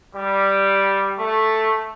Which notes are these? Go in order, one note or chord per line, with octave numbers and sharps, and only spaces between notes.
G3
A3